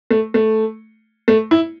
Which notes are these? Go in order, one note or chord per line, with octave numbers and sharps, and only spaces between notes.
A3
A3
A3
E4